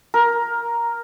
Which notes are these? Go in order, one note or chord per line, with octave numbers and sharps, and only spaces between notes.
A#4